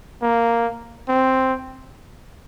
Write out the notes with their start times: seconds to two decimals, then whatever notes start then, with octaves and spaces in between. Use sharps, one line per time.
0.22 A#3
1.08 C4